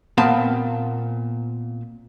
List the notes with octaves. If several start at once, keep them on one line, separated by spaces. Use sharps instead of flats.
A#2 B3 C4 F5 A5